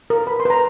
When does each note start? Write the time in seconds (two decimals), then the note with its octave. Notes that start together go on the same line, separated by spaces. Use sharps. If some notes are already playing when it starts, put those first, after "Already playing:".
0.10 A#4
0.27 B4 B5
0.40 C6
0.45 B4 A#5